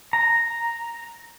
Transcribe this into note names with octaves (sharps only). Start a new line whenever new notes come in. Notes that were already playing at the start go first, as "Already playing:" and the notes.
A#5